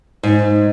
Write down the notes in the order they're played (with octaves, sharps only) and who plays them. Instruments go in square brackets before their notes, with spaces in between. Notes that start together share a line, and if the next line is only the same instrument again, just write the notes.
[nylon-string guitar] G#2